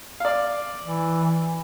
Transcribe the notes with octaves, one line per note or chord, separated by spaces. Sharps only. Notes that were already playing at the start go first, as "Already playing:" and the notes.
D5 F5
E3